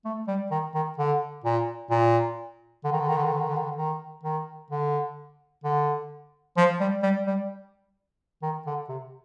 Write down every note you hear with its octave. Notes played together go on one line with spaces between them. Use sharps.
A3
G3
D#3
D#3
D3
A#2
A#2
D3
D#3
D3
D#3
D3
D#3
D3
D#3
D3
D#3
D3
D#3
D#3
D3
D3
F3
G3
G3
G3
D#3
D3
C3